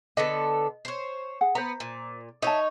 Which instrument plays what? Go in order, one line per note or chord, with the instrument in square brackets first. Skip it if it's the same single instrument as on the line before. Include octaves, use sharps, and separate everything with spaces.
[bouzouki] D3 B3 A4 [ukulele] D#5
[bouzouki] C5 C#5
[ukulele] G#4 F#5
[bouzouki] B3 [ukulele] C5 A#5
[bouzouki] A#2
[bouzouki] D#4 C#5 [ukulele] E5 A5